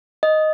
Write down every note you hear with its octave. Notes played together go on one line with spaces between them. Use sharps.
D#5